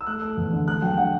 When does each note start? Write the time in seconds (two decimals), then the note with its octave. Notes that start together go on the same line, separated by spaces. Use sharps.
0.01 E6
0.06 A3 F#6
0.22 A3
0.37 E2
0.52 D3
0.67 A3 F#6
0.82 F#3 G5
0.97 D4 F#5